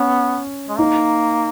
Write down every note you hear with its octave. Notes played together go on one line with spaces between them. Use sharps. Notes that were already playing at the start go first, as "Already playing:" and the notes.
Already playing: B3 C#4
G#3
A#3 D#4